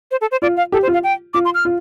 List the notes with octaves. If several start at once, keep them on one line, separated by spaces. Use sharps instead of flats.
C5
A4
C5
F4 D5
F5
G4 A4
C5
F4
F5
G5
F4 D6
C6
F6
F4